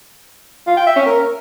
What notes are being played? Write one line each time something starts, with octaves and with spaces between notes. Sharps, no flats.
F4
G5
E5
C#4
A#4